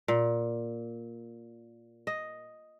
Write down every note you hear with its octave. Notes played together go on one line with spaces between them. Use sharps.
A#2
D#5